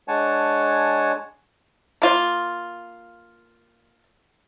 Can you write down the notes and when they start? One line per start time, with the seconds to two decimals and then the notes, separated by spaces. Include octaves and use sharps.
0.08 G#3 D4 C#5 F#5 G#5 A5
2.02 A#3 F4